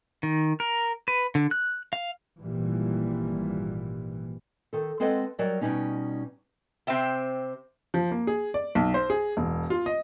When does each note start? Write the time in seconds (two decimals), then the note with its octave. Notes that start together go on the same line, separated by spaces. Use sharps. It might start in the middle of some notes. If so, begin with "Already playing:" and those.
0.23 D#3
0.60 A#4
1.08 B4
1.35 D3
1.51 F#6
1.93 F5
2.40 G#1 A#2 E3 G3
4.73 D#3 A4
5.00 G#3 C4 A4 B4 D#5 F#5
5.38 F#3 G3 A#4 D5 D#5
5.61 B2 F3 G3 C#4 D#4
6.87 C3 C4 C5 E5 G5
7.94 F3
8.11 A#3
8.27 G#4
8.54 D5
8.75 B1
8.94 C5
9.10 G#4
9.37 E1
9.70 F4
9.86 D#5